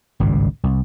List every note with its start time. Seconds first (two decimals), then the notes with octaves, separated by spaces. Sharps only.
0.20 G#1 C#2 G2 A#2
0.63 C2